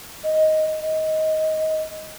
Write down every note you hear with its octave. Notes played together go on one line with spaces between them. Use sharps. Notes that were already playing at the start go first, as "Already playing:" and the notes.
D#5
D#5